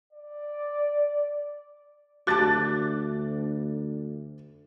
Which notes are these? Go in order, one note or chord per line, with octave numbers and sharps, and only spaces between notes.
D5
D2 F#4 A5 D6 F#6 A6